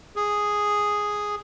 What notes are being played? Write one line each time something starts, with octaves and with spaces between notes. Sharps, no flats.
G#4